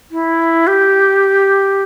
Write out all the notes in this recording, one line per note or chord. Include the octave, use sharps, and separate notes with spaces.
E4
G4